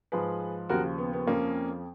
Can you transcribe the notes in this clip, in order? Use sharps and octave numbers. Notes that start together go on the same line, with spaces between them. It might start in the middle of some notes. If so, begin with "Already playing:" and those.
G#2 F3 G#4 B4
D#2 C#3 F3 F#4 A#4
B3
B3
F2 F3 A#3 C#4